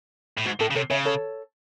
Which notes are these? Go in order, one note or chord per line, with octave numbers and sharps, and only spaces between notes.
A2
G#2 F#4
A2 A4
C#3
C3 A4 C#5
C#3 C#5 E5
A4 C#5